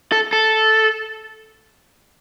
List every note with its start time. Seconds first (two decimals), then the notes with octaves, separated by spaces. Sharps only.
0.12 A4
0.33 A4